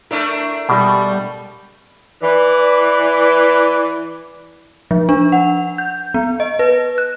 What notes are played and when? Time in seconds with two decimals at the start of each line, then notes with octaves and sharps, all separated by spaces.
0.11 A3 D4 E4 A#4
0.69 B2 G3
2.22 E3 D5
4.91 F3
5.09 D4
5.32 F#5
5.78 G6
6.14 B3
6.40 D#5
6.59 B4
6.98 F#6